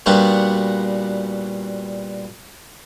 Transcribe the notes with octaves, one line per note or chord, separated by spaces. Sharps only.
A#2 G3 B3 D4 F#4